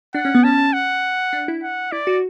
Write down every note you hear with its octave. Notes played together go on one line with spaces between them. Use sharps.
D4 F#5
C#4
B3
C#4 A5
F#5
D4
E4
F#5
E4 D5
F#4